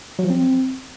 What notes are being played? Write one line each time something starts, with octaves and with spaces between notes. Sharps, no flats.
F#3
F3
C4